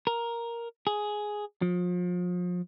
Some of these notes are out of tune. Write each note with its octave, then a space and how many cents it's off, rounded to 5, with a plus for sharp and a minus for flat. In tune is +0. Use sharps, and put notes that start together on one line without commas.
A#4 +5
G#4 +5
F3 +35